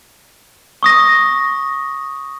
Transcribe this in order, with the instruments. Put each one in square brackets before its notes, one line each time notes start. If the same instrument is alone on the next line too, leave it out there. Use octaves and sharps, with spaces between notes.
[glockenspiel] C#6 D#6 A#6